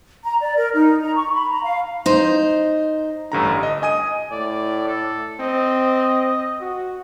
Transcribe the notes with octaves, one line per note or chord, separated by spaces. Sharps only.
A#5
D5
A#4
D#4
A#5
C#6
B5
A#5
F5
D#4 C5
A1 G2 D3 A#5
D#5
D#5 G#5 D#6 D#7
A2 D5
A4
C4 D#5
F#4